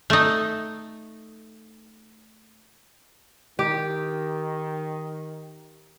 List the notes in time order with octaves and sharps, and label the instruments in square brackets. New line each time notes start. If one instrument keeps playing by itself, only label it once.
[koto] A3 D#4
[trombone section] D#3 [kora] G4